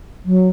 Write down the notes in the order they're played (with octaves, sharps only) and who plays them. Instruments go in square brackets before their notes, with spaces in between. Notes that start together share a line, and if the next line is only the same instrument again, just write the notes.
[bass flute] F#3